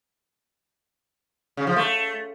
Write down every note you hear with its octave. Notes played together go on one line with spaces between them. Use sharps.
C#3
F3
A3